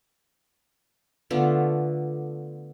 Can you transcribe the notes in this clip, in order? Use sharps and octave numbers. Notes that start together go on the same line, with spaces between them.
D3 A3 B3 F4